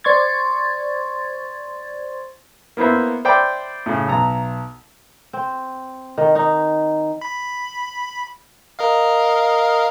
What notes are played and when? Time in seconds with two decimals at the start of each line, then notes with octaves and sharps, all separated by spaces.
0.04 C5 D5 C6 C#6 G#6 A6
2.77 A#3 B3 E4 C5 E5
3.25 C5 D5 E5 G5 B5 D6
3.86 A2 C#3
4.08 B1 A#5
5.33 C4
6.18 D#3
6.35 D#4
7.21 B5
8.79 A#4 D#5 F5